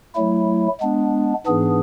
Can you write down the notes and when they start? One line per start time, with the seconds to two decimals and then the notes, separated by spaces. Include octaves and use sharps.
0.15 F#3 A3 E4
0.81 G#3 B3 D4
1.47 G#2 E3 B3 D4 G#4